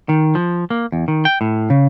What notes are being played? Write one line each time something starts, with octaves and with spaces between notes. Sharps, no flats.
D#3
F3
A#3
E2
D#3
G5
A2
C#3